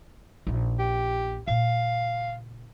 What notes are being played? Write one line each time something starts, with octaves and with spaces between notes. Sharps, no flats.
A#1 D#4
G4
A#2 C#3 F5